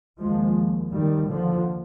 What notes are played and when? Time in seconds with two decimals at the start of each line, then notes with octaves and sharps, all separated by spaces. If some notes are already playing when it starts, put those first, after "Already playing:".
0.19 D#2 F3 G#3
0.92 D#2 D#3 G3
1.28 D3 F3